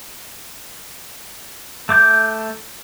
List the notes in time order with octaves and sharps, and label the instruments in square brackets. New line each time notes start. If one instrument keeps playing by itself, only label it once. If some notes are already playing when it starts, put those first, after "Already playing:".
[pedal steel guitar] A3 D6 G6